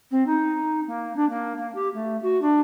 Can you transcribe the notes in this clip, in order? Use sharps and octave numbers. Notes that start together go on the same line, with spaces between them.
C4
D#4
A#3
D4
A#3
A#3
G4
A3
F#4
D4